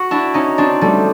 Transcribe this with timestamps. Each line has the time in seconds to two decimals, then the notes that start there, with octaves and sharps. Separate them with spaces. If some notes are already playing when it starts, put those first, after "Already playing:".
Already playing: F#4
0.11 D4 E4
0.34 C#4 D#4
0.58 C4 D4
0.81 G3 A3